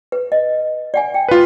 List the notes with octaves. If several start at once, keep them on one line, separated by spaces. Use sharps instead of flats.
B4
D#5
D5 F#5 G#5
G5
F4 B4